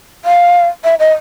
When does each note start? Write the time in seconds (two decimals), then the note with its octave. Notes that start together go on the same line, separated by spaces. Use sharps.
0.25 F5
0.84 E5
1.00 D#5